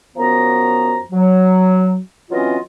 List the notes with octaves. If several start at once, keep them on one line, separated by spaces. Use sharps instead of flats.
F#2 F3 B3 F#4 A#5
F#3
E3 F#3 C4 C#4 F4 D#5